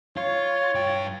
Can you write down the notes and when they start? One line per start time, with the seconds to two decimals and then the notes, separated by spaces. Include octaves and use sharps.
0.17 F4 C#5
0.75 G2 G5